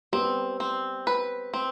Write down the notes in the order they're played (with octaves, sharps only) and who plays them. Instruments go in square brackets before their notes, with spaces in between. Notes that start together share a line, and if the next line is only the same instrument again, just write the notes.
[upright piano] G3 B3 [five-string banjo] C4
[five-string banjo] C4
B4
C4